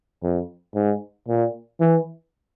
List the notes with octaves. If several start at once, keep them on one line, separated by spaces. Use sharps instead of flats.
F2
G#2
A#2
E3